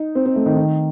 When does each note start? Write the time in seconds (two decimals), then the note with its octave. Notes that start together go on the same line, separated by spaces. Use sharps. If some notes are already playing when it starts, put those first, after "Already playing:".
Already playing: D#4
0.15 C4
0.26 C4
0.36 A3
0.46 D#3
0.56 D#3